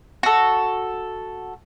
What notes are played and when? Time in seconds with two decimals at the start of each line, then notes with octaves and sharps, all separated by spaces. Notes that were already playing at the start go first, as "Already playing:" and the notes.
0.23 F#4 A4